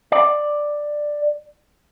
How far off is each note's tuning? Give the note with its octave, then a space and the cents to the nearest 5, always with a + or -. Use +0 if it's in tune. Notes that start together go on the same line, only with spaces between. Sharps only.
D5 +10